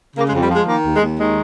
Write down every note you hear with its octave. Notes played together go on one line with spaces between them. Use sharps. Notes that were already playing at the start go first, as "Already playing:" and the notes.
C#3 A#3
G#3
F2
G3
F3 G#3
D#3 A#3
D#2
G#3
D#2
D#3 G#3